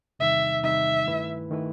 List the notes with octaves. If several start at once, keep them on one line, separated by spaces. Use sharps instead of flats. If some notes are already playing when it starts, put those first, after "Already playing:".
E2 C3 D#3 G3 D#4 E5
E2 C3 D#3 G3 D#4 E5
G2 D#3 A3 E4 B4
D#3 A3 E4 B4